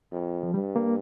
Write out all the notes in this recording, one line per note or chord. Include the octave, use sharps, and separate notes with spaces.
F2
F3
G2 G3
A#3